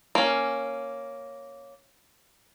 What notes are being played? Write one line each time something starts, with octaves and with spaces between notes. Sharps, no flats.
A#3 C#4